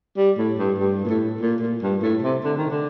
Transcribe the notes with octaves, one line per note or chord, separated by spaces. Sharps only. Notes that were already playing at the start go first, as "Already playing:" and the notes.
G3
A2
G2
G2
A#2
A2
A#2
A#2
G2
A2
C3
D3
D#3
D3